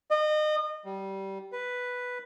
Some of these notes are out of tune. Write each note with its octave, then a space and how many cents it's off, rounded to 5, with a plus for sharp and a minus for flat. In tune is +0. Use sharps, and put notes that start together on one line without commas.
D#5 -30
G3 -20
B4 +0